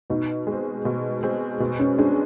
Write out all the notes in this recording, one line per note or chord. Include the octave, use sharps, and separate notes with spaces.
B2 D#4
G#3
C4
B2
G#3 C4
B2
C#4
G#3 C4 D4